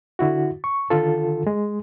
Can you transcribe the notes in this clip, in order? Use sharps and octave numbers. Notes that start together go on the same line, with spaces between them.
D3 E4 F#4
C#6
D3 D#3 F4 A4
G#3